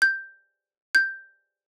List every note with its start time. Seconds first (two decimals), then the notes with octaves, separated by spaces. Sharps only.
0.02 G6
0.95 G6